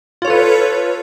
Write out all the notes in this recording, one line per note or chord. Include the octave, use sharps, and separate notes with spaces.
F4 A4 B4 C#5